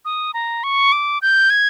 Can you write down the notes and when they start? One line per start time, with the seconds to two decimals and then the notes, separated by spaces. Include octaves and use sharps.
0.05 D#6
0.34 A#5
0.64 C#6
0.92 D6
1.22 G6
1.50 G#6